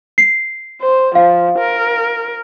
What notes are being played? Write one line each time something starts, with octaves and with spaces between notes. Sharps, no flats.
C7
C5
F3 F5
A#4